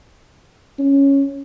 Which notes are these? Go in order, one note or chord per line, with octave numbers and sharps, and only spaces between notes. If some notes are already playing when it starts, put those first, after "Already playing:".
C#4